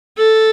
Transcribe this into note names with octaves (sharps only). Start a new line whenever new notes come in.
A4